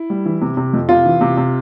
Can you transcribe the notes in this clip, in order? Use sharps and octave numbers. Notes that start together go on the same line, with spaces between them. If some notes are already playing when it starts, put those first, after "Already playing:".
Already playing: E4
G3
E3
C3
C3
F2
C3 F4
E3
C3
C3